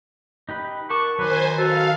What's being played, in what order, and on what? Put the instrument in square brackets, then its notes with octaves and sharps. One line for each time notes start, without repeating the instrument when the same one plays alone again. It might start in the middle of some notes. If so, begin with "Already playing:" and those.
[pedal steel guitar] D#4 G4 B4
[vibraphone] A#4 [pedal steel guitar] F#5 A5 D6 [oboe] C#6
[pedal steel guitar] D#3 F#3 [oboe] B4 [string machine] C5 G#5
[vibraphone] F#4 [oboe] A4 [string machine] F5